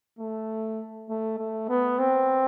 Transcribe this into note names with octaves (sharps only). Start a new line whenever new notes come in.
A3
A3
A3
B3
C4